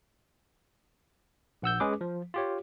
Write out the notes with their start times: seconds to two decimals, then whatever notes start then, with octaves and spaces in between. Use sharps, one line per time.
1.62 A#1 F#5 E6 G6
1.80 G#3 C#4 G#4 B4 D6
2.01 F3
2.34 F4 G4 C#5